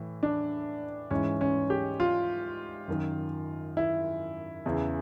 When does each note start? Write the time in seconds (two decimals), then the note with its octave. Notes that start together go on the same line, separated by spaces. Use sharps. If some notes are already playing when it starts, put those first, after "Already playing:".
Already playing: A2 E3
0.23 D4
1.11 G#2 E3 C#4
1.41 C#4
1.70 G4
2.00 F4
2.88 F#2 D#3
3.77 E4
4.66 E2 C#3 E3